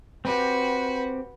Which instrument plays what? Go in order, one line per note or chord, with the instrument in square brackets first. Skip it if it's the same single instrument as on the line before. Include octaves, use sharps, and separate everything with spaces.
[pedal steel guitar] C4 G4 [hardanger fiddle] F#4 B4